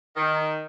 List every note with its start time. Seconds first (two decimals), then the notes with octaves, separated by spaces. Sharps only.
0.17 D#3